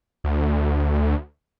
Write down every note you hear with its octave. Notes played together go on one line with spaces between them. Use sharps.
D2